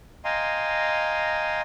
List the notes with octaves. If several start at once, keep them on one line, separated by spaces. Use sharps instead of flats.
D#5 F5 G5 G#5 A#5 C6